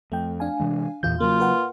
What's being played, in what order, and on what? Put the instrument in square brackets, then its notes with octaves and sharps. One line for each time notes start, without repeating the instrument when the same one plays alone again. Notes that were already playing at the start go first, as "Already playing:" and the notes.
[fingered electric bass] F2 [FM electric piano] A3 G5
[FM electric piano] D4 F5 G#5
[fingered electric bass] C3 E3 G#3
[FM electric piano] E2 F4 G6 [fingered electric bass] A#2 E3
[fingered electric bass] C#3 F#3 [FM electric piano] A#3 [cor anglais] F4
[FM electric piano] A#4 B4 F#5